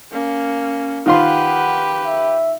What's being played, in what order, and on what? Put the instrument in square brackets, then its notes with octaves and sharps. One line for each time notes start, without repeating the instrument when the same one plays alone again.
[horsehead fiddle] A#3 C#4
[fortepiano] D#3 F4 C6 [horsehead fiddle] G4 B4 [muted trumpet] F#5
[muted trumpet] E5